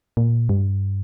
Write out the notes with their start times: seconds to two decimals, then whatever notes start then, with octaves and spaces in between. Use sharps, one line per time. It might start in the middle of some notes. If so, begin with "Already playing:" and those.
0.17 A#2
0.49 G2